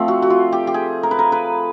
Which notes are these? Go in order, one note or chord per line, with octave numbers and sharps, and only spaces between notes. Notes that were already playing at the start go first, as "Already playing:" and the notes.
Already playing: F3 A3 C4
F#4
F#4
F4
G4
G4
G#4
A#4
B4
A#4
B4